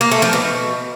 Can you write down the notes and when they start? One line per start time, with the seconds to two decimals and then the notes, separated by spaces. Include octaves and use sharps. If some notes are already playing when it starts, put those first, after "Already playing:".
0.01 A#3
0.11 A3
0.22 F3
0.33 B2